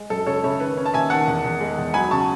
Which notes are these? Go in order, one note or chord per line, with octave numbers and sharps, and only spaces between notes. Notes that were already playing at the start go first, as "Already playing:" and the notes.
Already playing: G#3
F#2 A4
C#3 A4 C#5
C#3 C#5 E5
D#3 B4
C#4
A5
D#2 E5 G#5
D#3 F#5 A5
E2
E2
G#3
E2
F#3 G#5 B5
C#3 A5 C#6